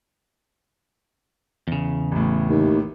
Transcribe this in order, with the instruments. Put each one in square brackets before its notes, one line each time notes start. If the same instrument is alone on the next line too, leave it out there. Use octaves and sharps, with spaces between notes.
[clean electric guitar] E2 C#3
[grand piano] A1 A2
[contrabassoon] D#2